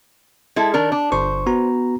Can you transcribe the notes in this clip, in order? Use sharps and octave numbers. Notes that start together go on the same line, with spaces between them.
G#3 E4 A4
D#3 D4 A#4
D4
G1 C5 C#6
B3 F#4 A#5